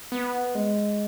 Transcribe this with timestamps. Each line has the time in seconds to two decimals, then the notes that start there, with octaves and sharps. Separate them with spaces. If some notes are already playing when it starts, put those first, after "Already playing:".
0.12 B3
0.55 G#3